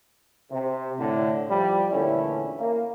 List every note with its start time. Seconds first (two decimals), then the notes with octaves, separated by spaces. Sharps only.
0.52 C3
0.99 A2 D3
1.50 F3 G3
1.91 E2 A#2 D3 A3 C#4 E4
2.60 A#3